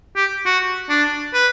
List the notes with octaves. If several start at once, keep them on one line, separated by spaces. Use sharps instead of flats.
G4
F#4
D4
B4